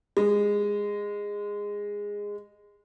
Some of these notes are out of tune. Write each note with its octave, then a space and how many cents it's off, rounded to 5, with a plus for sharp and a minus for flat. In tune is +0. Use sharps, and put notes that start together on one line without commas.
G#3 -15